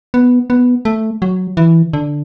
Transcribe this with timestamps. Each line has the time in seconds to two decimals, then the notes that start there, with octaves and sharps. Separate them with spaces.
0.14 B3
0.50 B3
0.85 A3
1.22 F#3
1.57 E3
1.93 D3